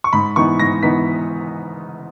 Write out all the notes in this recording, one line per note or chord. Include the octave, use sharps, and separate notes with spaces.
C#6
G#2 B5
E3 B3 D#4 C#6
G#2 A#6
E3 B3 D#4 B6